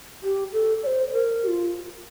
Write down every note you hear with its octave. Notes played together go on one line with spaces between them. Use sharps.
G4
A4
D5
C5
A#4
G4
F4